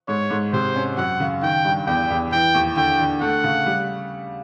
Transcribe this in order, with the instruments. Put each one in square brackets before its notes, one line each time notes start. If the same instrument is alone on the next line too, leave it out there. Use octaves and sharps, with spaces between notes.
[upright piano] G#2 [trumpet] C#5
[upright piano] G#2
[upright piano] C3 [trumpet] C5
[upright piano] C#4
[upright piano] F#2 [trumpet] F#5
[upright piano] C#3
[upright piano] D#3 [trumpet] G5
[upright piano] G2
[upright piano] E2 [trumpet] G5
[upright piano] E2
[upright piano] E3 [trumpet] G5
[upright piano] D#2
[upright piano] D3 [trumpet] G5
[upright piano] D3
[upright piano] A3 [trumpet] F#5
[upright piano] C#3
G3